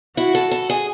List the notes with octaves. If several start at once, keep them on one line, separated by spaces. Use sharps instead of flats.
E4 F#4
A4
A4
G#4